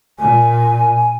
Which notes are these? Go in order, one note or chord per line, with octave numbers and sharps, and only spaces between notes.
A#2 G#5